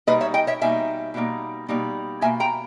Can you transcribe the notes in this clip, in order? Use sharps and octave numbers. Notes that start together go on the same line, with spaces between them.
B2 G3 A#3 D#4 B4 D#5
C#5 E5
D#5 G5
C#5 E5
B2 G3 A#3 D#4 E5 G#5
B2 G3 A#3 D#4
B2 G3 A#3 D#4
B2 A#3 D#4 E5 G#5
G5 A#5